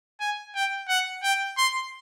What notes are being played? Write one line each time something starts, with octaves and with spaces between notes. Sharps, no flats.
G#5
G5
F#5
G5
C6